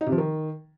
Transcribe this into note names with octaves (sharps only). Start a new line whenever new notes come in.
D#4
C3
F3
D#3